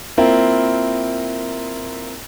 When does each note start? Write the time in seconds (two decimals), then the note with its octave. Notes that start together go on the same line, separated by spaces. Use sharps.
0.18 A#3 C4 E4 F4 A#4